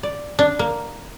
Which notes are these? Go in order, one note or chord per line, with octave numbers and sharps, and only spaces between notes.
D5
D4
A#3